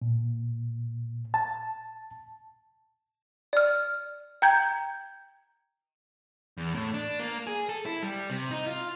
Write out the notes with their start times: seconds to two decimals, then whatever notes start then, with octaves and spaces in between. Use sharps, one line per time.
0.02 A#2
1.34 A5
3.53 D5 F6
4.42 G5 A#5 G6 G#6
6.57 E2
6.75 A2
6.94 D4
7.19 A#3
7.47 G#4
7.69 A4
7.85 E4
8.02 G3
8.30 C3
8.51 D#4
8.68 F4